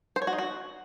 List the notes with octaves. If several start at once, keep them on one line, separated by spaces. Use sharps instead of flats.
C5
C#5
F#4
D#4
F#4